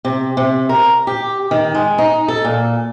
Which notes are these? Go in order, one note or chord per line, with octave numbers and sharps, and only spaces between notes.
C3
C3
A#4
G4
D#3
G#3
D#4
A4
A#2